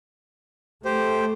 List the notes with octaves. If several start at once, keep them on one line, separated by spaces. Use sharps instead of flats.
A3 G4 C5